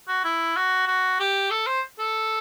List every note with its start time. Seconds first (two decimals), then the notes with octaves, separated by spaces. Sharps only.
0.08 F#4
0.24 E4
0.56 F#4
0.87 F#4
1.20 G4
1.51 A4
1.67 C5
1.99 A4